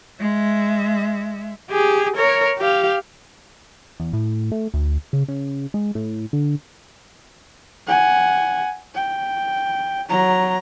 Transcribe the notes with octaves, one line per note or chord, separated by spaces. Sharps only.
G#3 E5
G4 G#4
A#4 C#5
G4 F5
E2
A2
A3
D2
C#3
C#3
G#3
A2
D3
F#5 G#5
G5
F#3 A#5